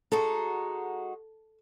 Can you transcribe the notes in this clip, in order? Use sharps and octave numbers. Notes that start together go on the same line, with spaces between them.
G#3 D#4 F#4 A4